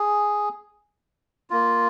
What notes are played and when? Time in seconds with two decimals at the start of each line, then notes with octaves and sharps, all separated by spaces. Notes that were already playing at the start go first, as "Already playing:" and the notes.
Already playing: G#4
1.50 A#3 F4